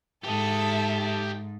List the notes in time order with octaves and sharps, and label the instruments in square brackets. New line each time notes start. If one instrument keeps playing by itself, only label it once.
[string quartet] G#2 [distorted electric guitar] G4 D#5 [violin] A4 E5